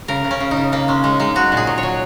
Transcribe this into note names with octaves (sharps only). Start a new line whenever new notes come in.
C#3 A#4
C#3
C#4
C#3
D#4
C#3
C#3 A#3
G#3 C#4
G#3 D#4
G#3 D#4
F#3 F#4
A#2
G#4
F#3
C#5
F#3